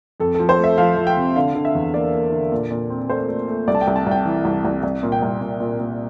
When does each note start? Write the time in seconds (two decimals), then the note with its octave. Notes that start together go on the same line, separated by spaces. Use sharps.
0.20 F2 A4
0.35 F3 A4
0.49 C5
0.59 A3
0.64 E5
0.78 F3 F5
0.97 F3
1.07 G5
1.17 C3
1.36 D3 F5
1.55 D3
1.65 E5
1.75 E2
1.94 A#3 D5
2.12 A#3
2.32 D3
2.52 A#2
2.71 A#2
2.90 C4
3.09 A3 C5
3.29 A3
3.48 A3
3.67 C2 D5
3.75 A5
3.81 G5
3.87 C2
3.96 A5
4.06 C2
4.11 G5
4.25 E3
4.45 C2
4.64 C2
4.83 C2
5.03 A#2
5.12 G5
5.22 C2
5.41 A#2
5.60 A#2
5.80 A#2